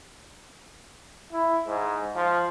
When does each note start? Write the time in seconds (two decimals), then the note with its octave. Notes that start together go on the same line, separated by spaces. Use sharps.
1.33 E4
1.67 G#2
2.15 F3